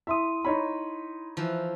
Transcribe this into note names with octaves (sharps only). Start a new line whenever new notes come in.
E4 E5 C6 D#6 D#7
D#4 C#5 B5
E3 F3